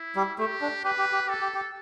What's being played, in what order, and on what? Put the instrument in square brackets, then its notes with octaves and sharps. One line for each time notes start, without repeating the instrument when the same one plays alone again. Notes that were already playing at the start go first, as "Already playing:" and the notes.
Already playing: [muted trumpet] E4
[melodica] G3
[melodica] A3 [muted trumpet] G4
[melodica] D4
[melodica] G4 [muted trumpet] B4
[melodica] G4
G4
G4
[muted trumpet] A4
[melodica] G4
G4